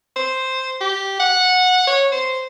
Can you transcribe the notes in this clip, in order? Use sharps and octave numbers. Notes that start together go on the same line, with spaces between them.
C5
G4
F#5
C#5
C5